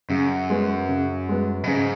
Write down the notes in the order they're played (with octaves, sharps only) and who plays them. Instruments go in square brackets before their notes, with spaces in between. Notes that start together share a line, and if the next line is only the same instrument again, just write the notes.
[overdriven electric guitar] F#2 [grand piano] C#3
[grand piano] G#3 B3
C#3
G#3 B3
[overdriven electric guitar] B2
[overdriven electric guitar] G#2 [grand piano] C#3